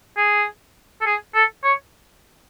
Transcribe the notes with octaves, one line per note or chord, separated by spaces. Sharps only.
G#4
A4
G#4
A4
C#5